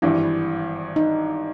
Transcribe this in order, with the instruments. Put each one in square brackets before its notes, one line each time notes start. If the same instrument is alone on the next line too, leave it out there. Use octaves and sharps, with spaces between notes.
[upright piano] G#1 G2 E3 [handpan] E4
[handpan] D#4